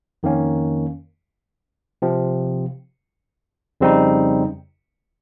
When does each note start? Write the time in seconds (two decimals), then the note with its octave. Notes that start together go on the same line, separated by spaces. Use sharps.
0.23 F2 D#3 A#3 C#4
2.02 C3 F3 C4
3.81 F2 C#3 G3 C4 D#4